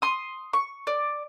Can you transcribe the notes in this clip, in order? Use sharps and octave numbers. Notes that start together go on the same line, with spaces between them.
C6 D#6
C#6
D5